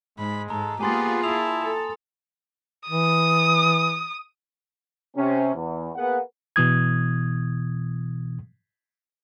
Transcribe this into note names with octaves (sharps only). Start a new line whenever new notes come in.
G#2 G#3 B5
G#2 A4 A#5
A#3 B3 F4 G4 G#4 G#5 C6 A6
E4 A5 D#6 F7
A4
E3 D#6
C3 C#4
E2
A#3 B3 G#4 B4 F#5
B2 E3 D#6 G#6